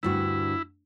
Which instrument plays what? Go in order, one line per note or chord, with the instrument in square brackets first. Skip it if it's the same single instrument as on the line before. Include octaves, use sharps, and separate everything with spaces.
[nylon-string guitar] D2 G2 F#4 [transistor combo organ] E4